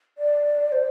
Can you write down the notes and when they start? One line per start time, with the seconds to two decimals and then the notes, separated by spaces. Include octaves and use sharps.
0.18 D5
0.72 C5